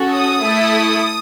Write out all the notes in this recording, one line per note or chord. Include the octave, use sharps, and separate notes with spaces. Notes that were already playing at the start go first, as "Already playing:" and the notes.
Already playing: C#4 F#4 A4
D#6
A3 E4 A4